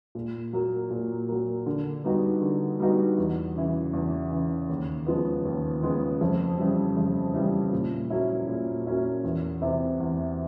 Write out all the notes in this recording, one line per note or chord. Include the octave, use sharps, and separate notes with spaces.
A#2
F#3 A#3
A#2
F#3 A#3
D3
G3 B3 D#4 F#4
D3
G3 B3 D#4 F#4
E2
C#3 E3
E2
C#3 E3
D#2
C#3 F3 G#3 B3
D#2
C#3 F3 G#3 B3
F2
C#3 E3 G3
F2
C#3 E3 G3
A#2
F#3 A#3 C#4 E4
A#2
F#3 A#3 C#4 E4
E2
C3 E3
E2